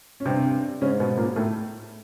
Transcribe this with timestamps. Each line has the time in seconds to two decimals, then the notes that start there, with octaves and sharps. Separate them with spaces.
0.20 C#4
0.26 G2 C3 C4
0.81 G#2 C#3 C#4
1.00 B2 B3
1.17 A#2 A#3
1.36 A2 A3